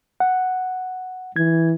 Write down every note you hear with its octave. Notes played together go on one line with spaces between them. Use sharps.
F#5
E3 G#6